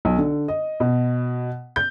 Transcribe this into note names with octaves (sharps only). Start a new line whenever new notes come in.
B1
D3
D#5
B2
G6